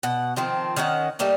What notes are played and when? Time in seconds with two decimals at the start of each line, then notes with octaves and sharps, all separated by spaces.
0.03 B2 F#5
0.36 D#3 F3 C4
0.76 D#3 C#4 D#4 F#5
1.19 G3 A3 A#3 D#4